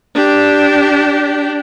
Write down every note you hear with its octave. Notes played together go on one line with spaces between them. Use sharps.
D4 G4